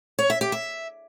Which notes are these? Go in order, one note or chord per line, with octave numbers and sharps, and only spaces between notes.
C#5
E5
G4
E5